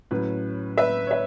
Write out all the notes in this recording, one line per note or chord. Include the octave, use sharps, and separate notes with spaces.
A2 F#3 C#4 B4
B4 E5
C#5
B4 E5